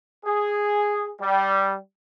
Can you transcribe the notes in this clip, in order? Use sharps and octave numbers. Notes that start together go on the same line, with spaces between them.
G#4
G3